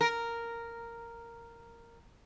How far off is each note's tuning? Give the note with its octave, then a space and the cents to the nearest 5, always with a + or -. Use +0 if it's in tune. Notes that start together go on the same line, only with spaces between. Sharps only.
A#4 -5